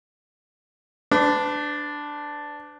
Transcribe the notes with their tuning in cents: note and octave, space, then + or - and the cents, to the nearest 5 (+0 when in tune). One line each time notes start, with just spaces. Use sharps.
D4 +0 B4 +40